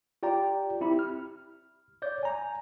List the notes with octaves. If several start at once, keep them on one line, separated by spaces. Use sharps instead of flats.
F4 G4 D5 G5 A#5
C4 E4 G4 B5
F6
C#5 D5 G6
G#5 A#5